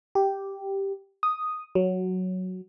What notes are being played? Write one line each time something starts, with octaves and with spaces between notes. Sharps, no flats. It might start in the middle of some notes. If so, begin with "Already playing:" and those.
G4
D#6
F#3